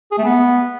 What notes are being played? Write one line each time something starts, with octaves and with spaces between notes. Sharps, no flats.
G#4
A3
B3